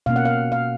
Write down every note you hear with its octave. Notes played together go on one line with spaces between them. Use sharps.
B2 A#3 C#4 F5
F#5
F5
F5